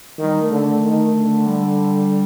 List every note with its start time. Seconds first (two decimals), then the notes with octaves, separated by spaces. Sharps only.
0.19 D#3 G3
0.40 A3
0.51 D3
0.61 A3
0.82 D#3
1.13 D3
1.46 G3